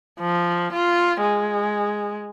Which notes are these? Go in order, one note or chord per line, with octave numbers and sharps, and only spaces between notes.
F3
F4
G#3